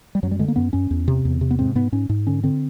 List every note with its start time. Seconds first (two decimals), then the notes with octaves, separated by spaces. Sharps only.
0.15 G3
0.23 F#2 F#3
0.31 G3
0.39 D3 G#3
0.48 A#3
0.56 F#2 B3
0.73 F#2 C#4
0.91 E2
1.08 C3
1.25 E2
1.41 C3
1.51 B3
1.59 G#2 C4
1.75 G#2 B3
1.92 G#2 C#4
2.09 G#2
2.27 D3 C#4
2.44 D3 C4